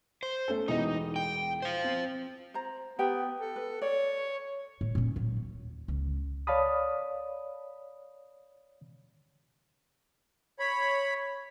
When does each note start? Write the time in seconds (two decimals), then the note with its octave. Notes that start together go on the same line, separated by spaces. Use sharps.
0.23 C5
0.48 A3 C#4 A4
0.68 E1 E3 D#4 D#5
1.16 G5
1.62 C5 F5
1.84 C4
2.54 C5 A#5
2.99 B3 G4 G5
3.40 A4
3.56 B4
3.82 C#5 D5
4.81 A2
4.95 A#2 C#4
5.16 F#3
5.37 D#2
5.88 C#2
6.47 C#5 D5 F5 A5 B5 D#6
10.59 C#5 B5